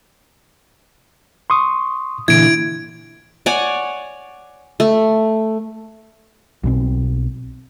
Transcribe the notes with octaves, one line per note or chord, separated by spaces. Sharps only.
C6 C#6 D#6
A#2 D3 E3 E4 G#6 D7
C#5 D5 F#5 G#5
A3
B1 B2 C4